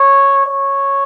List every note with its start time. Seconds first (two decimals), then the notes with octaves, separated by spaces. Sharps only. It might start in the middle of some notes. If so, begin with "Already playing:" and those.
Already playing: C#5
0.46 C#5